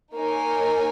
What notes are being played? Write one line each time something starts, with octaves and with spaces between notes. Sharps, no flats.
A#3 D#4 A#4 C#5 G#5